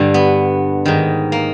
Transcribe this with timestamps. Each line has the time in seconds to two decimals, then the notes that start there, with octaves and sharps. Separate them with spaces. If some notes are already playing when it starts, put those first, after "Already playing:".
Already playing: G2 D3
0.14 B3
0.86 G#2 D#3
1.32 A#3